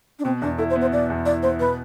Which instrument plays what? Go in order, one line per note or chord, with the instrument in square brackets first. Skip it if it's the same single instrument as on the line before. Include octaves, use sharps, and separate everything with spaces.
[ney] D4
[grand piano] B2 [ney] C4
[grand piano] E2 [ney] D4
[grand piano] E4 [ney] A4
[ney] C5
[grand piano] B3
[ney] C5
[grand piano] B2 [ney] D5
[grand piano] E2
[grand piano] E4 [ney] D5
[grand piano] B3 [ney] C5
[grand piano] B2 [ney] B4